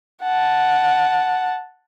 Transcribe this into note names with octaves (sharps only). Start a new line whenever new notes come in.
F#5 A5